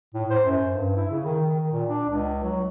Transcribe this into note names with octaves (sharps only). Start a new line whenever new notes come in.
A2
C5
F#2
G2
E4
C#3
D#3
D#3
A#2
D4
C#2
F#3